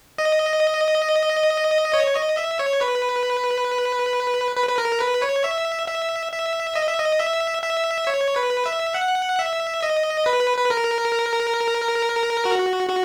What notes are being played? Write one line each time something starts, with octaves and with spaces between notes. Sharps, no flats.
D#5
C#5
D#5
E5
C#5
B4
B4
B4
A#4
B4
C#5
E5
E5
E5
D#5
E5
D#5
E5
E5
C#5
B4
E5
F#5
E5
D#5
B4
B4
A#4
F#4
F#4